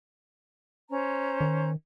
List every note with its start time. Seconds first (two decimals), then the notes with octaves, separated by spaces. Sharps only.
0.90 C#4 C5 A#5
1.41 D#3